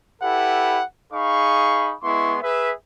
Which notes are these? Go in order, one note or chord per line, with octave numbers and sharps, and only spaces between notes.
E4 G4 A4 B4 F#5
D#4 G#4 F5 B5 C#6
G#3 B3 E4 C6 C#6
G#4 B4 E5